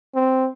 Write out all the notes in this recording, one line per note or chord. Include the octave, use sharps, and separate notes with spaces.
C4